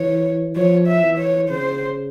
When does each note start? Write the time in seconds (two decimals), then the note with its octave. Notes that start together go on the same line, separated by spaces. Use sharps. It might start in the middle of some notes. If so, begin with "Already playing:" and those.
Already playing: E3 C#5
0.56 F3 C#5
0.88 E5
1.03 E3
1.19 C#5
1.50 C#3 C5